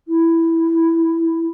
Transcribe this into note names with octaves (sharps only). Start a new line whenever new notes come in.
E4